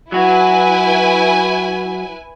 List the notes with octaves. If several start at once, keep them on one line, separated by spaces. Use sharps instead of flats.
F#3 E4 F#4 B4 G#5